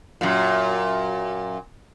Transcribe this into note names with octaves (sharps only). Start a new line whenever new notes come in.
F#2 A#2